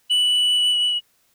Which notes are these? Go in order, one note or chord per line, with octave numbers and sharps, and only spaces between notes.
F#7